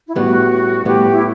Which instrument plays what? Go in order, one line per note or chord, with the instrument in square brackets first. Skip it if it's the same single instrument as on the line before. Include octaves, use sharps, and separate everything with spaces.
[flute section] E4
[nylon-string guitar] A2 G3 B3 [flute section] F#4
[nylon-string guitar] A2 G3 B3 [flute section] G4
[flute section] E4